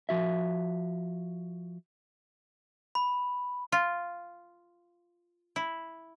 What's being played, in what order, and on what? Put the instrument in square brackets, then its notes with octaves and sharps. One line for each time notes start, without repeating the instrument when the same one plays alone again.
[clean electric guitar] F3 F#4 E5
[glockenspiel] B5
[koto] F4
E4